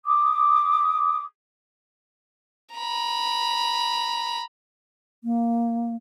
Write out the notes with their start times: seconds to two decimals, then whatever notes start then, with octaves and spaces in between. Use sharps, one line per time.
0.06 D6 D#6
2.75 A#5 B5
5.24 A#3